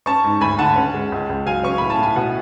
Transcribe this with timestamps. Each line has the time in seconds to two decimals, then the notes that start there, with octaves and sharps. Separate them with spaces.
0.06 C#4 A5 C#6
0.24 G#2
0.41 D2 G#5 B5
0.59 D3 F#5 A5
0.76 C#4
0.94 G#3
1.12 C#2
1.29 C#2
1.46 F#3 F5 G#5
1.63 C#4 C#6
1.78 A2 B5
1.90 A5
1.99 A2 G#5
2.16 B2 F#5